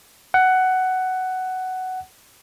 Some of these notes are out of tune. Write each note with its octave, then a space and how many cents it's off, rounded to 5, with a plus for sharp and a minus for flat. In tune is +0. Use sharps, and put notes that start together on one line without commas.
F#5 +10